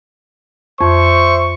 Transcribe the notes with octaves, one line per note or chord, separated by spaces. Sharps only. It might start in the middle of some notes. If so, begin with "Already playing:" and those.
F2 C5 E5 C#6